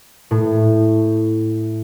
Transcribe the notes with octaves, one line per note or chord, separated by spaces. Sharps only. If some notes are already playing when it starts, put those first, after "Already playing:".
A2